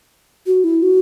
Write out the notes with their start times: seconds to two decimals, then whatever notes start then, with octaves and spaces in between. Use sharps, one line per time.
0.47 F#4
0.64 E4
0.83 F#4